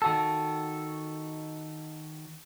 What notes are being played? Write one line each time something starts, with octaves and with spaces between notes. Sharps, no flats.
D#3 F#4 A4